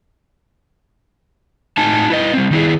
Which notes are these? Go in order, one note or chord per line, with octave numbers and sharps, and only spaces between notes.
A2 D#4 G#5 A5
E4 B4 D#5
G3 C4
D#3 E4 G#4